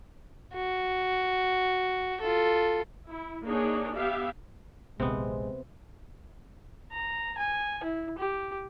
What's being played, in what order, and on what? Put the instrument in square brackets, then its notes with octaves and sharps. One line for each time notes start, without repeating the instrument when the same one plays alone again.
[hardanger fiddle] F#4
F4 A4
[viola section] E4
A#3 D4 D#4 G#4 C#5
B3 G4 E5 F5
[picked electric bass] A#1 D#2 [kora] C3 B3 [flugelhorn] G#3 [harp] C4
[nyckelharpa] A#5
G#5
E4
G4